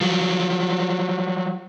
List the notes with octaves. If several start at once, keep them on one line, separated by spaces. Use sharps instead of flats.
F3 F#3